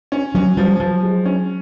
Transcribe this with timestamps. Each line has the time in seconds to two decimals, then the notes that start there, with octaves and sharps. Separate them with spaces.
0.12 C#4
0.35 F#3 C#4
0.57 F3 G3
0.80 F3 F#3
1.03 G#3
1.25 C#4